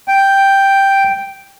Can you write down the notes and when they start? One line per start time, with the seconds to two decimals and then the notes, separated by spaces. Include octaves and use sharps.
0.08 G5